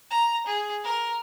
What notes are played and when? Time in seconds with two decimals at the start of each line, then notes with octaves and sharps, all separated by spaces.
0.11 A#5
0.46 G#4
0.84 A#4